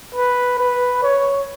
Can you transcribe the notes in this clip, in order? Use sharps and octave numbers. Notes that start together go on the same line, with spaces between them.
B4
B4
C#5